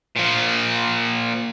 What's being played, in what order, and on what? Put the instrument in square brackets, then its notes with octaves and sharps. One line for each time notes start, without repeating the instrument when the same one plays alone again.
[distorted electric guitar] A#2 F3